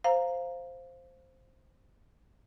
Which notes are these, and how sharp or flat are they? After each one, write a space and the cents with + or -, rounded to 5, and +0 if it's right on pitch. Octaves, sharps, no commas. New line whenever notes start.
C5 +0 F5 +0 A#5 +0